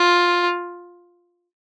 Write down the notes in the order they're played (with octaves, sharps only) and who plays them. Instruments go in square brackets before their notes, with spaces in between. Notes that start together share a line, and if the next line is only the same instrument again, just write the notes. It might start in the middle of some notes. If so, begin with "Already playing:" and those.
Already playing: [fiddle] F4